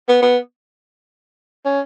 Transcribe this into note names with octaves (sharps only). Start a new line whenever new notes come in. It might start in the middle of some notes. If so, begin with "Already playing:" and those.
B3
B3
C#4